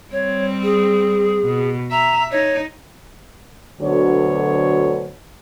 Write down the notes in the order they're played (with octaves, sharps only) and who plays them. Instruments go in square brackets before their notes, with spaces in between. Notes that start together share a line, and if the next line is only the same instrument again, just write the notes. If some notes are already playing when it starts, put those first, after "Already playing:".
[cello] G3 C4 [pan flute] C#5
[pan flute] G#4
[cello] B2
[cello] E5 [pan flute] A#5
[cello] D#4 [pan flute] C#5
[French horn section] D2 B2 D3 F#3 D4 C#5